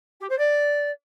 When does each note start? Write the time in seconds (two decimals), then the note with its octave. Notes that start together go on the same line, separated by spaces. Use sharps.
0.20 G4
0.29 C5
0.38 D5